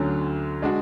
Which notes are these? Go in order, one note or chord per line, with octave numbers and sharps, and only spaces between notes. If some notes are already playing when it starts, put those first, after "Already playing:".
Already playing: D2 D3 F#3 C#4
G#3 D4 F#4